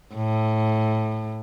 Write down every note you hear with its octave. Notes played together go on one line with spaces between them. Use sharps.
A2